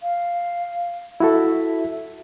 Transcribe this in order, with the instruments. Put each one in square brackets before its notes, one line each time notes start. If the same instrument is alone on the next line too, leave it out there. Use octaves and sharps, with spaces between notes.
[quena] F5
[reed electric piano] E4 F#4 A4 [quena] E5